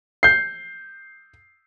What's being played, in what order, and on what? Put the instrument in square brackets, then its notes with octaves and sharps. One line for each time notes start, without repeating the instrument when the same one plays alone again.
[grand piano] G6 C7